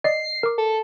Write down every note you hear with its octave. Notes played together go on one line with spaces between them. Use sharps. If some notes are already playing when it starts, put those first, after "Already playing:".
D5 D#5 C7
A#4 D6
A4